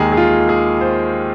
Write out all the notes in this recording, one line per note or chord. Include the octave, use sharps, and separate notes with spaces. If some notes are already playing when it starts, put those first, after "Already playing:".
Already playing: D#2 D#3 G#3 G#4
G#4
F4
G#4
C5